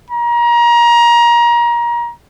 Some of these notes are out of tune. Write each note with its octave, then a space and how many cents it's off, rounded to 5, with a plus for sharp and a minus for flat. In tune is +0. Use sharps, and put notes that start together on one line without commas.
A#5 +25